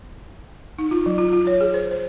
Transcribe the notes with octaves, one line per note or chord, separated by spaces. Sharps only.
D#4
F4
F#3
F4
F4
C#5
G#4
C5
C5